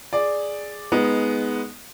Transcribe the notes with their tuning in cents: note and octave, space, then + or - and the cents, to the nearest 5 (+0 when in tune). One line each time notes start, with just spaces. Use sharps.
G#4 +0 D5 +0
G#3 +5 B3 +0 D#4 +20